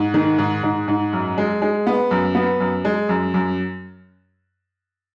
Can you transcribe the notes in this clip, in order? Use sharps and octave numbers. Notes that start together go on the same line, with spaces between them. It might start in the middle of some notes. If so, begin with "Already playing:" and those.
Already playing: G#2
D#3
G#2
G#2
G#2
F#2
G#3
G#3
B3
F#2
B3
F#2
G#3
F#2
F#2